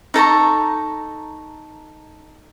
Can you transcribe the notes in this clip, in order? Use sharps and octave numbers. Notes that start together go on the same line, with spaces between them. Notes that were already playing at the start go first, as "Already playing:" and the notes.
D#4 A4 A#5 C#6